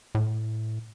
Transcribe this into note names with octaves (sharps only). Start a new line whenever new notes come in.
A2